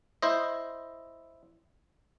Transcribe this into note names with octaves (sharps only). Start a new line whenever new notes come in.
E4 C5 D#5